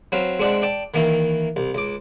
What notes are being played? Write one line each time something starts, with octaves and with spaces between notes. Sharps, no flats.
F#3 C4 B4 F5
G#3 C4 D4 D5 E5 F#5
D5 G5 A5
D#3 E3 A#3
C2
C#2 D6